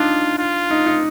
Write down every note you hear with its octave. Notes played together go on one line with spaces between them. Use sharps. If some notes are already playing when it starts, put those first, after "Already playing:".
Already playing: D4 D#4 F4
F4
D#4
D#4